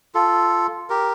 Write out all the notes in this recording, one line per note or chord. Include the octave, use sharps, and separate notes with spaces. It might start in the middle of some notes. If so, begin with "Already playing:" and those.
F4 A4
G4 A#4